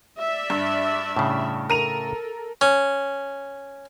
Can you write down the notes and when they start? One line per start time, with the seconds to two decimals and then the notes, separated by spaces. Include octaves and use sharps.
0.17 D5 E5
0.50 G2
1.16 A2 C#3
1.70 A4 A#4 D#7 F7
2.61 C#4